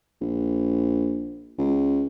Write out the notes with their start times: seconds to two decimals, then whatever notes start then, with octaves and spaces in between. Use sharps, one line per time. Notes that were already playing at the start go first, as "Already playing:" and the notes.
0.21 A#1
1.58 C#2